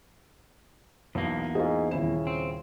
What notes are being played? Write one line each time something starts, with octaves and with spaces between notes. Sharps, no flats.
B1 E2 A#3
G#2 F4 G#4
D#1 C#3 E4 E7
C4